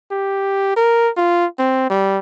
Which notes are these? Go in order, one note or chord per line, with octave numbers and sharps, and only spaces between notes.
G4
A#4
F4
C4
G3